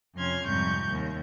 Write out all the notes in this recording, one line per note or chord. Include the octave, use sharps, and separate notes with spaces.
F2 C3 C#4 C6 F6 G#6
F2 G#2 C3 G3 C#6 G6
D#2